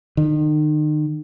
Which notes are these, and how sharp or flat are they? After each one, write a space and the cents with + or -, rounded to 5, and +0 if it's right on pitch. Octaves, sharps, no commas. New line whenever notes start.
D#3 -40